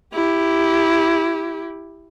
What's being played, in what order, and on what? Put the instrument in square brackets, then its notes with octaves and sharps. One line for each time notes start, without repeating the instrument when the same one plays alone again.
[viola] E4 G4